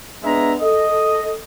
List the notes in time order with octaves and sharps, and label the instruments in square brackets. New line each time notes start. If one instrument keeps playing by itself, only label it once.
[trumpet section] G#3 E5 A#5 [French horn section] B3 D4
[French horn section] A4 [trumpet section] D#5